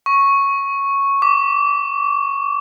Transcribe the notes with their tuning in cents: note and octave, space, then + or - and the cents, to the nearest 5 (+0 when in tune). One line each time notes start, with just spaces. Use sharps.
C#6 -5
D6 -30